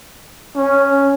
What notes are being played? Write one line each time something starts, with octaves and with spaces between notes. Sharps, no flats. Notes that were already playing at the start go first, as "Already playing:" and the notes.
C#4